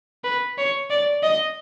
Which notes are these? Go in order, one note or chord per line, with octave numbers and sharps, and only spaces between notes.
B4
C#5
D5
D#5